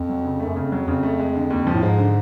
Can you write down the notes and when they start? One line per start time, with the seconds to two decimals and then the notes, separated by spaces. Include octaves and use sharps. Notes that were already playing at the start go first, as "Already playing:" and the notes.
Already playing: F2
0.09 F#3
0.24 C#3
0.40 A3
0.46 F#2
0.56 F2 C#3
0.72 F#3
0.88 F2 C#3
1.03 A3
1.19 G#3
1.35 D3
1.50 D#2
1.67 F3
1.74 A2
1.83 G#2 G#3
1.98 D3